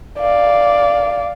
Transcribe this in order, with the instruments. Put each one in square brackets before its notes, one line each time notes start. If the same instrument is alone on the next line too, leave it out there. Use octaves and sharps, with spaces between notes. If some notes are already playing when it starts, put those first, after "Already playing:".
[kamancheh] D5 F5